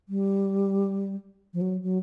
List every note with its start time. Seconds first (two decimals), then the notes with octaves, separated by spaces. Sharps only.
0.09 G3
1.53 F3
1.61 F#3
1.83 F#3